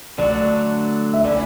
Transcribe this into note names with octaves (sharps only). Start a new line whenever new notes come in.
D3 F#3 A3 D4 F#4 D5
E5
D3 A3 C#4 E4 D5